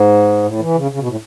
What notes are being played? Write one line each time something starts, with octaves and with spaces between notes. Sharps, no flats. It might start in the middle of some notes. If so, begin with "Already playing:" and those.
Already playing: G#2
A2
E3
C#3
C#3
B2
A2